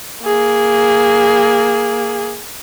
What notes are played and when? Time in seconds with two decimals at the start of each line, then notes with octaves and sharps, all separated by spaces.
0.24 A#3 G#4